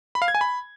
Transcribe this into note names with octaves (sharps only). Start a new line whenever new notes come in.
B5
F5
G#6
G#5
B5